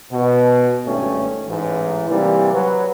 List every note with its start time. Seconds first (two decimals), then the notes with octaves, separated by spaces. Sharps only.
0.11 B2
0.85 G#1 G2 A3 C#4
1.48 A1 G#2 E3
2.09 C3 E3 G3 A#3
2.51 F#3 B4